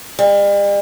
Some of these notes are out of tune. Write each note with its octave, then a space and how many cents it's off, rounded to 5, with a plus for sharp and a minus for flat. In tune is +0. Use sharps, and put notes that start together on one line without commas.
G3 +45